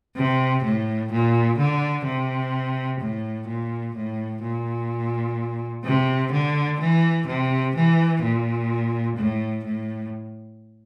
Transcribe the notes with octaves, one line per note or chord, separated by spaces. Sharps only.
C3
A2
A#2
D3
C3
A2
A#2
A2
A#2
C3
D3
E3
C3
E3
A#2
A2
A2